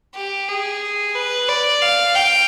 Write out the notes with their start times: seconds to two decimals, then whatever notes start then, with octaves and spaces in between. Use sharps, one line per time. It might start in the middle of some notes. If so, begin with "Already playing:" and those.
0.15 G4
0.48 G#4
1.15 B4
1.49 D5
1.82 F5
2.15 G5